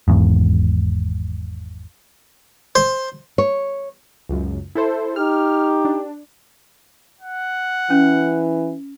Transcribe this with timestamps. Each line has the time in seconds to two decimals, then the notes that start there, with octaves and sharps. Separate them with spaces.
0.08 G#1 E2 G#2
2.75 C5
3.38 C#5
4.29 C#2 F#2
4.75 E4 A4 C5
5.16 D#4 G4 F6
5.85 D4
7.21 F#5
7.90 E3 C#4